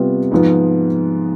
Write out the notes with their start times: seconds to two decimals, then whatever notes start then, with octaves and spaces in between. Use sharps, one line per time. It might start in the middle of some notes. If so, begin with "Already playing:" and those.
Already playing: C3 G3 B3 F4
0.32 G#2 F3 B3